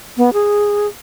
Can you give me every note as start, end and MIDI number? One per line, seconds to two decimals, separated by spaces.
0.17 0.30 59
0.33 0.87 68